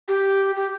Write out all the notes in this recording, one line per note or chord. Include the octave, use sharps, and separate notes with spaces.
G4
G4